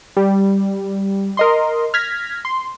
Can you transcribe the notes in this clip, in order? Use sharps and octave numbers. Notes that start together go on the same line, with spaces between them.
G3
A#4 D#5 C6
F6 G#6 A#6 B6
C6